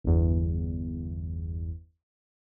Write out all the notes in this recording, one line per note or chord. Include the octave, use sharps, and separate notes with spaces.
G1 E2